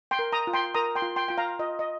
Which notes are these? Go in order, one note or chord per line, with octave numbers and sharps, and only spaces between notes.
G5 C6
A#4
A#5 D#6
F4
G5 C6
A#4 A#5 D#6
G5 C6
F4
G5 C6
F4 G5
F5 A#5
F4 D#5
D#5